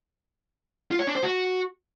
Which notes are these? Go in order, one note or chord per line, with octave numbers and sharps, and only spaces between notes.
F4
C#5
D4
C5
F#4